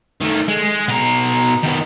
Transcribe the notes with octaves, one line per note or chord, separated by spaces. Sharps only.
D#3 A3
G#3
B2 A#5
D#3 B3